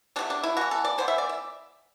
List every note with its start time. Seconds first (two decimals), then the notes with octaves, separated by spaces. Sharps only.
0.16 C3 F#3 A3 D4
0.30 D4
0.43 E4
0.57 E3 B3 F#4
0.71 A4
0.85 D5
0.98 E3 B3 C5
1.08 E5
1.18 D5
1.29 E5